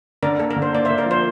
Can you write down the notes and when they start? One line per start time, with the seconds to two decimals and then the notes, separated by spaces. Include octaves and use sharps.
0.23 D3 A#4 D5
0.39 A#3 A4
0.51 A#4
0.56 D3
0.62 C5
0.73 A#3 D5
0.85 A#3 C5 E5
0.98 A#4 D5
1.06 F3 C5